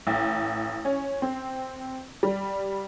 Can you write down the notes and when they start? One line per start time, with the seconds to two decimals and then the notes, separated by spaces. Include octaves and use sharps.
0.07 A1
0.85 C#4
1.22 C4
2.23 G3